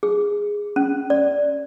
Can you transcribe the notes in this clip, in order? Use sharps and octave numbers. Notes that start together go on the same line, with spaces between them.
G#4
C#4
D5